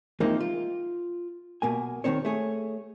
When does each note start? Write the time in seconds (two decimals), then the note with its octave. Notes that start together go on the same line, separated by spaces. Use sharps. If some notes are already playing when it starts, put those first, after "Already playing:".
0.20 E3 F3 G#3 A#3 C4 D#4
0.40 F4
1.62 B1 B2 A#3 G#5
2.04 C2 A2 D#3 C4 C#5
2.25 A3 G#4 C#5